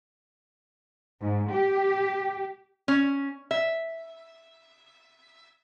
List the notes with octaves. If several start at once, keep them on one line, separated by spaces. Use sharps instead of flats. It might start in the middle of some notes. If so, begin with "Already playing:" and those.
G#2
G4
C#4
E5